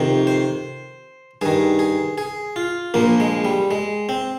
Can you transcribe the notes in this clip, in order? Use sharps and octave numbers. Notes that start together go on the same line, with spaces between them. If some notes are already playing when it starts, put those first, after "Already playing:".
Already playing: F2 C3 D#3
C5
G2 D#3 G#4
G#4
G#4
F4
A#1 A#2 F3 A#3
G#3
G3
G#3
C4